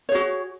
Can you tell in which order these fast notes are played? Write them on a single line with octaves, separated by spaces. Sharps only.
C#5 G#4 F#4